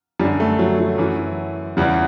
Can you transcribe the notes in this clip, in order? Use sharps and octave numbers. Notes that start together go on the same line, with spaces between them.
F#2 D3 G3
A3
F#3
F#3
F#2 E3
E2 C#3 E3 G3